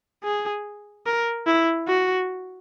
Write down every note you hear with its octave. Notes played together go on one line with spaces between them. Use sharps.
G#4
A#4
E4
F#4